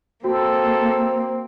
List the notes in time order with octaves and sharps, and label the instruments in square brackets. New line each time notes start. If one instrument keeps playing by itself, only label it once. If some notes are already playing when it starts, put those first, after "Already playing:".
[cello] A#3 [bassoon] C4 [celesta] F#4 [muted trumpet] A4